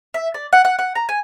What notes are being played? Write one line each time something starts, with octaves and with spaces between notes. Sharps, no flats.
E5
D5
F#5
F#5
F#5
A#5
G#5